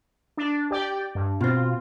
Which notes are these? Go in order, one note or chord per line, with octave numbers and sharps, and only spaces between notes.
D4
G4 D5 G5
G2
B2 C4 F4